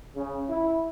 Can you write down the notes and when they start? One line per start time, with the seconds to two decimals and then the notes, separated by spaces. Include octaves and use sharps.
0.16 C#3
0.49 E4